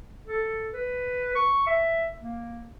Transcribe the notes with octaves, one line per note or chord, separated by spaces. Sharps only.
A4
B4
C#6
E5
A#3